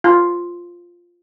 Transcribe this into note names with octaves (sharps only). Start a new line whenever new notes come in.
F4